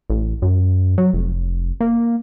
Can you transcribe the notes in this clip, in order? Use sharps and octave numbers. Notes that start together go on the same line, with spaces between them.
A1
F#2
F#3
F1
A#3